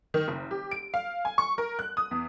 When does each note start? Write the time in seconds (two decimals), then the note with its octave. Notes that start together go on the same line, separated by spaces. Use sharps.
0.14 D#3
0.28 F#1
0.51 G4
0.71 D7
0.94 F5
1.25 G#5
1.38 C#6
1.58 A#4
1.79 F#6
1.97 D#6
2.11 E2